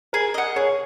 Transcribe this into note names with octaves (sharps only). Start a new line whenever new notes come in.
G#4 A#4
D#5 F#5
G#4 C#5